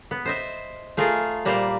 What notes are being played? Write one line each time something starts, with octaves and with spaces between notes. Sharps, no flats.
B3
C5 D#5 E5
A3 F4 G#4 A#4
A#2 G3 A#3 C5 A#5